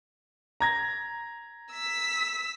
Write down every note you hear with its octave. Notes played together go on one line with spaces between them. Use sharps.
A#5 G#6 A#6
E6 B6